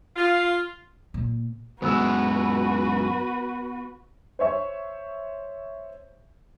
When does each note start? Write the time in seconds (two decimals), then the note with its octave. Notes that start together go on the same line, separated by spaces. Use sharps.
0.16 F4
1.14 A#2
1.82 F#2 G#3 B3 F#4 B4 F#5 E6
4.39 C5 C#5 E5 C#6